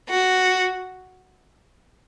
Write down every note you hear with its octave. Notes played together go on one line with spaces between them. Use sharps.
F#4